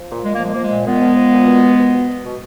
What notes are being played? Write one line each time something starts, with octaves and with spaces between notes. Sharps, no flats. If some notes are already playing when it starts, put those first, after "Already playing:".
Already playing: F3
A#2
A#2 G#3
A#3
F3 G#3
F3 A#3
G#3
A#2
A#2 G#3 B3
F3
F3
A#2
B2
B2
B2
B2
B2
B2